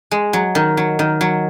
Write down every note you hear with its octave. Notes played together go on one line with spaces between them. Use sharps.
G#3
F#3
D#3
F#3
D#3
F#3